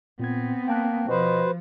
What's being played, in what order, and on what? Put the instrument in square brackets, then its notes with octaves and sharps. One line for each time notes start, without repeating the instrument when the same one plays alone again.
[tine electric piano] A#2 G#6 [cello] B3 C4
[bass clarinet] A#3 [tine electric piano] G5 A5 F#6
[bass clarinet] B2 [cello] F3 [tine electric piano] F#4 [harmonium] B4 C5